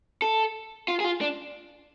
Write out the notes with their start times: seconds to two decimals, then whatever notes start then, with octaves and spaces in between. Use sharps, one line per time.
0.22 A4
0.88 F4
1.00 G#4
1.04 F4
1.21 D4